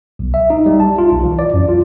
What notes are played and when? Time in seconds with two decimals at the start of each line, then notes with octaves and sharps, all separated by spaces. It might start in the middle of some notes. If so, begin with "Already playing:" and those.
0.19 B1
0.34 E5
0.50 D#4
0.66 G3
0.80 A5
0.98 F4
1.12 B1
1.23 E3
1.39 D5
1.54 F#2
1.69 F4